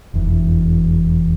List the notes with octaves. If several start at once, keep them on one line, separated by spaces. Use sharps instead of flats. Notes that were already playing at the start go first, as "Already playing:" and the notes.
F1 E2 E3